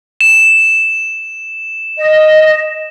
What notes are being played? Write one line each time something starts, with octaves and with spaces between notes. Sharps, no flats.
E7
D#5